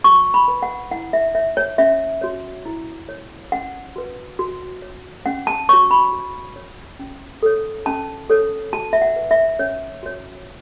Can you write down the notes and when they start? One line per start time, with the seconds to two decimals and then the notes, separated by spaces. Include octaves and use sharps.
0.04 F#4 C#6
0.34 B5
0.48 B4
0.63 F#5
0.91 E4 F#5
1.13 E5
1.35 C#5 E5
1.57 C#5
1.78 C#4 E5
2.21 F#4 C#5
2.65 E4
3.09 C#5
3.52 C#4 F#5
3.96 F#4 B4
4.39 F#4
4.82 C#5
5.26 C#4 F#5
5.47 A5
5.69 F#4 C#5 C#6
5.91 B5
6.12 F#4
6.56 C#5
6.99 C#4
7.43 A4 C#5
7.86 C#4 A5
8.30 A4 C#5
8.73 F#4 A5
8.93 E5
9.02 F#5
9.16 B4
9.31 E5
9.59 C#4 C#5
10.03 F#4 C#5